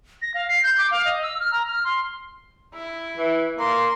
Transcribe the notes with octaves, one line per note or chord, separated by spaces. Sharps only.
A#6
F5
C7
G6
D6
F5
D#5
E6
F6
A#5
F6
C6
E4
E3
A#3 C6